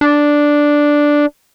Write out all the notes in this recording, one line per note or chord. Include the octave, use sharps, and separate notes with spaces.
D4